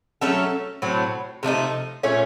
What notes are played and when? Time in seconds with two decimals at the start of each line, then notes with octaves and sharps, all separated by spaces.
0.21 F#3 A3 C#4 A4
0.82 A2 F#3 C4
1.43 C3 F3 A3 D#4
2.03 A#2 A3 C#4